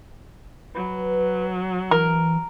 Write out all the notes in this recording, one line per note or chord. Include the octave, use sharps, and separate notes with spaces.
F#3 B4
E3 A#4